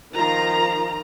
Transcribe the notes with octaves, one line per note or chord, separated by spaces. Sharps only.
D#3 F3 F4 A#5